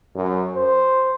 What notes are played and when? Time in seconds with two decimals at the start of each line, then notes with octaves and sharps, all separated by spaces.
0.15 F#2
0.55 C5